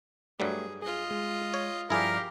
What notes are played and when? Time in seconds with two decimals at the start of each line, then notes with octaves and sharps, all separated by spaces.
0.40 G2 F#3 G3 A3 G4 G#4
0.82 F4 G#4 D#5
1.11 G#3
1.54 C#5
1.90 G2 F3 E4 G4 G#4 A#4 D5 F5